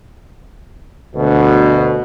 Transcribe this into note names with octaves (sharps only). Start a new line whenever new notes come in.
D2 B2